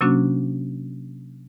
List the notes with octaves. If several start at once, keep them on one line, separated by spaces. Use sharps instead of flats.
C3 F#3 A#3 C#4 D4 F#4